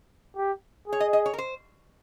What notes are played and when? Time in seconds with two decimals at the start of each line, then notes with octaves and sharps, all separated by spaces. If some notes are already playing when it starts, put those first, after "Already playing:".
0.37 G4
0.88 G#4 C#5
1.00 D#5
1.13 D#5
1.26 C#5
1.33 A#4
1.38 C5